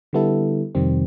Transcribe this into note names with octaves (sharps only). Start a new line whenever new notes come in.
D3 G3 B3 E4 A4
F2 C3 D#3 G3 C4